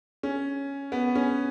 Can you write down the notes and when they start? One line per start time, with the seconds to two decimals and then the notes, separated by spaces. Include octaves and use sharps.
0.23 C#4
0.92 B3
1.15 C#4